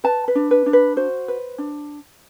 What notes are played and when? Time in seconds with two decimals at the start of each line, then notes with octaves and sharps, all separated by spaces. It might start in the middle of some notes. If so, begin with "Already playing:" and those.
0.04 B4 A5
0.28 B4
0.35 D4
0.51 B4
0.66 D4
0.73 B4
0.96 F#4 C5
1.28 B4
1.58 D4